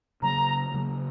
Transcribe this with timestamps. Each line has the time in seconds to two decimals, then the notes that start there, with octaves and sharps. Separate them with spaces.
0.22 C#3 F#3 A#3 A#5
0.74 C#3 F#3 A#3